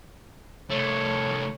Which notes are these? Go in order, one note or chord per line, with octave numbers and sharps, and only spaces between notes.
C2 A3 C#5